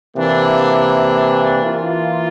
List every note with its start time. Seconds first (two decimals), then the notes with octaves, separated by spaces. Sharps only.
0.16 C3 E3 A#3 D4
1.64 E3 A#3 F4